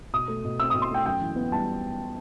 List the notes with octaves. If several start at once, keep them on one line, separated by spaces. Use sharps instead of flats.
B2 D#6
A3
B2
C4 E6
D#6
B2
C6
A3 G5
F#2 G5
E3
B3
G3 A5